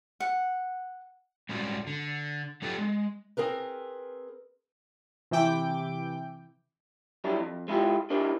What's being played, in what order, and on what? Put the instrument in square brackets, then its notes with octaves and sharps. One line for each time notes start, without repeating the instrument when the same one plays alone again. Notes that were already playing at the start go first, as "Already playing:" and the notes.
[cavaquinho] F#5
[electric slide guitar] G3 G#3 C#4 F#4 D5
D3
F#3 D4 F4 G4 A4 B4
G#3
[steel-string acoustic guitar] C4 G#4 A#4 B4
[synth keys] C3 E3 E4 G5 D6
[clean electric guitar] F#3 G3 D4 E4
F2
G#3 E4 F4 G4
D4 E4 G4 A#4 C5